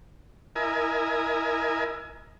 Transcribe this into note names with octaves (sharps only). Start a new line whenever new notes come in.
E4 A#4 D#5 G#5